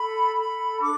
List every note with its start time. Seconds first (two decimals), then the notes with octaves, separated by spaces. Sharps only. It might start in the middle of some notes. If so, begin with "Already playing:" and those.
Already playing: A4 B5
0.37 A4 B5
0.80 D4 D6